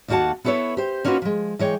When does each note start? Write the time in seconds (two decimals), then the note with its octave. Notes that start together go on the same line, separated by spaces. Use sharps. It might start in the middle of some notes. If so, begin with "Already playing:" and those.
0.08 D#2 A3 A#3 F#4 F#5 A5
0.44 B3 E4 A4 B4 C#5
0.77 G4 C5
1.04 A#3 C#4 D#4 F4 F#4 B4
1.22 F3 G#3
1.59 E3 G#3 C#5 G5